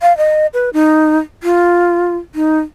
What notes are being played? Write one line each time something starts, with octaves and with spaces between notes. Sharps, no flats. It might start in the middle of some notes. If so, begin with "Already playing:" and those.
F5
D#5
B4
D#4
F4
D#4